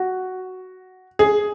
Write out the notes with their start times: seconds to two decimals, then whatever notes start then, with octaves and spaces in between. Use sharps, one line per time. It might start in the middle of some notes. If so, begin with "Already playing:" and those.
Already playing: F#4
1.19 G#4